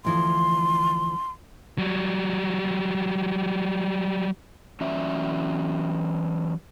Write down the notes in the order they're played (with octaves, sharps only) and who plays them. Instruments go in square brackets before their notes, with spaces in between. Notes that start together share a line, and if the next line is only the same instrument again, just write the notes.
[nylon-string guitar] D2 E3 F3 [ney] C6
[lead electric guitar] F#3 G3
[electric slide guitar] E3 F#3 C#4 D5 E5